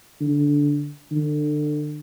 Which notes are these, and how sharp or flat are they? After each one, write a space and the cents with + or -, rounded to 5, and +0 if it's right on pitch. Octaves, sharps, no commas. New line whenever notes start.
D3 -10
D3 +25